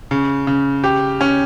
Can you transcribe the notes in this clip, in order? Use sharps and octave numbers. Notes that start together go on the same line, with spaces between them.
C#3
C#3
G4
C#4